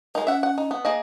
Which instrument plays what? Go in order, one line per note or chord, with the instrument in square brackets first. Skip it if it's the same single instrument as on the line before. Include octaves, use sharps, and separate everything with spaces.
[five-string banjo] G#3 D#4 [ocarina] A#4
[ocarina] C#4 [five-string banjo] E5 F#5
[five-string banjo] F#5
D#4
B3
A#3 G#4 D#5